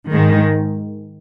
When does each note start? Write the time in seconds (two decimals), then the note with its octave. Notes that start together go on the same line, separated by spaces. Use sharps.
0.11 G#2 D#3 G#3